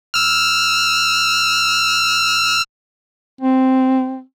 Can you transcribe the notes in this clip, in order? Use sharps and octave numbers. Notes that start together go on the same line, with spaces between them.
E6 F6
C4